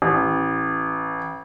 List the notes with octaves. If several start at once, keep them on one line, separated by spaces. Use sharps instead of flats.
A1